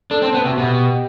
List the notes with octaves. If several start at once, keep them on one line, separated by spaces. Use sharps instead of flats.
D4 A4
C4
B3
C3 F#4
B2 G4